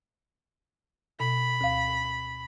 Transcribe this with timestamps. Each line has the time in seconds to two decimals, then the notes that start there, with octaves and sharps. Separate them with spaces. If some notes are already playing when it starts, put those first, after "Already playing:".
1.20 B2 B5
1.61 D2 F5